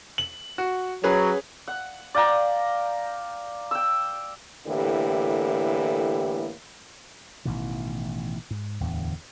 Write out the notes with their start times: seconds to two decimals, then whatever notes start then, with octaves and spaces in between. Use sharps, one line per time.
0.18 F#7
0.58 F#4
1.04 F#3 C#4 G#4 B4
1.68 F#5
2.15 D5 F5 G5 A#5
3.71 G5 E6
4.67 A2 D3 E3 A#3 G4
7.45 A1 B2 D#3 E3
8.51 G#2
8.80 D1 E2 D3